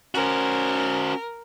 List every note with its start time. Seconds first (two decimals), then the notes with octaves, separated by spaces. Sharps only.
0.15 C#4 F#4 A#4 C5